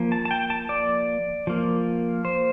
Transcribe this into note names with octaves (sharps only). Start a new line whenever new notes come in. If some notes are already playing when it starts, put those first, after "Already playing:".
Already playing: F3 A#3
A5
A5
G5
A5
D5
F3 A#3
C5